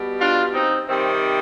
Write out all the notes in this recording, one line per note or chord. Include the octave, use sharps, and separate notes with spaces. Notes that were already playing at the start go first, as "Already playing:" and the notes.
Already playing: B2 G3
D4 F4
C4 D#4
C3 D#3 G3 C4